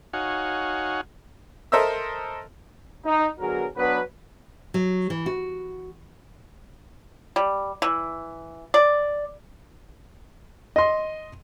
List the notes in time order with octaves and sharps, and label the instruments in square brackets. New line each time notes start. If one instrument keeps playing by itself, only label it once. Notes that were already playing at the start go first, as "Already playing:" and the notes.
[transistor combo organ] D#4 F#4 C#5 F5 F#5 G#5
[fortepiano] A4 A#4 C5 D#5 E5 E6
[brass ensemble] D#4
D3 F#3 B3 F#4 G#4 A#4
F#3 B3 D4 B4
[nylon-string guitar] F#3
E3
F#4
[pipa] G3
E3
D5
[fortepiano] D#5 C6